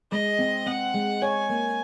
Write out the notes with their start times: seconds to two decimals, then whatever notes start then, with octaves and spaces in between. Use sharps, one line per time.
0.12 G#3 D#5
0.39 C4
0.66 C4 F#5
0.94 G#3
1.22 C#5 G#5
1.49 A#3